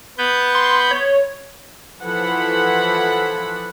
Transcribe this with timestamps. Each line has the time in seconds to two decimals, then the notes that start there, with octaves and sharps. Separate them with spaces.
0.18 B3 B4 G6
0.55 C6
0.91 C#5
2.01 E3 F3 A4 F#5 B5